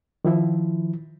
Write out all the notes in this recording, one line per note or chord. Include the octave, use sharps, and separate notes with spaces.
D#3 F3 E4